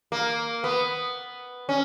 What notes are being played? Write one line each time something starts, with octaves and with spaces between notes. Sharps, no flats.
A#3
B3
C#4